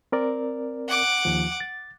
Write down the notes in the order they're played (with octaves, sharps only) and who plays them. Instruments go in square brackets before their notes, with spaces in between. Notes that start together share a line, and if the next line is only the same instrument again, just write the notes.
[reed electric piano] C4 A#4 D5
[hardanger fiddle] F#5 D6
[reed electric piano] D#2 F3
A6